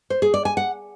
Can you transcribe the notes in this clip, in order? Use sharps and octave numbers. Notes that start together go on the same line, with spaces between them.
C5
G#4
D5
G#5
F#5